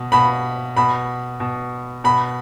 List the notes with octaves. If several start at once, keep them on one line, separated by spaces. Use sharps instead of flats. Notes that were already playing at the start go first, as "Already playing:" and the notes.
Already playing: B2
B2 B5
B2 B5
B2
B2 B5